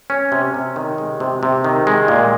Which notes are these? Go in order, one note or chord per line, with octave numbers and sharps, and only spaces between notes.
C#4
C3
C3
D#3
G#3
C3
C3
D#3
G#3
A#2